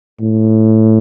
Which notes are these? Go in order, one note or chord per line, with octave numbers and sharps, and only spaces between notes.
A2